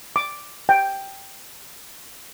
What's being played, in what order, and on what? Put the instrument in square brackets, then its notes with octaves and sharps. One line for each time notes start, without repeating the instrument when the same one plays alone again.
[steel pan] D6
G5